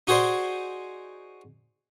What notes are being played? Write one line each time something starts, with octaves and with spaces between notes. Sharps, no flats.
D#4 F#4 G#4 C5 D5